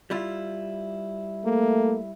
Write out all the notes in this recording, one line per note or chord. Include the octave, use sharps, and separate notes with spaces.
G3 E4 F4
A3 A#3